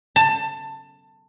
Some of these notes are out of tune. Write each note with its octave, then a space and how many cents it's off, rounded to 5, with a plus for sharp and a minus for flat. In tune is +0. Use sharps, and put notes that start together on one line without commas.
A5 +20